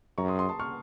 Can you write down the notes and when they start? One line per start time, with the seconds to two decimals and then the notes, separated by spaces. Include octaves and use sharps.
0.18 F#2 A#5 C#6
0.28 C6 D#6
0.39 C6 D#6
0.49 A5 C6
0.60 C#6 F6